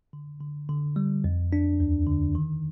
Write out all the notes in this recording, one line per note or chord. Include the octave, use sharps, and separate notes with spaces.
D3
D3
D3
G3
F2
D4
D#2
D3
D#3